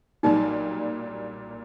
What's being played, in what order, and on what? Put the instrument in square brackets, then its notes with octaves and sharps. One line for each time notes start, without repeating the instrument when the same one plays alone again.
[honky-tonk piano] B1 A#2 G3 A#3 [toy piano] D#4